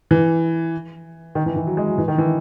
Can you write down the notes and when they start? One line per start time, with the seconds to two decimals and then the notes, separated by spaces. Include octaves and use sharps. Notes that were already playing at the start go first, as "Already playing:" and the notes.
0.11 E3
1.35 D#3
1.46 E3
1.56 E3
1.67 F#3
1.77 G#3
1.87 F#3
1.98 E3
2.08 D#3
2.18 E3